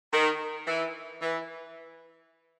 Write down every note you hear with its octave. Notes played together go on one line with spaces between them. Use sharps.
D#3
E3
E3